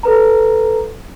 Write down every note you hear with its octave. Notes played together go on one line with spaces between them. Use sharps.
A4 B4 A#5